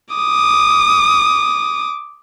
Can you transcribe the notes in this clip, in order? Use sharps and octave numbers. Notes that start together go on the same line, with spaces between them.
D6 D#6